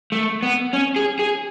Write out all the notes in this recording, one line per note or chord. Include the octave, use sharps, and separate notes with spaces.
A3
B3
C#4
G#4
G#4